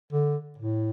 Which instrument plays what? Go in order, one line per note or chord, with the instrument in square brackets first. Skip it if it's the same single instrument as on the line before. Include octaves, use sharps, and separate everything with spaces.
[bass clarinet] D3
A2